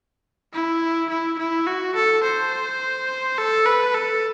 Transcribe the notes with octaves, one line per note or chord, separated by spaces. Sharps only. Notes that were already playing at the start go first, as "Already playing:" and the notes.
E4
E4
E4
F#4
A4
C5
A4
B4
A4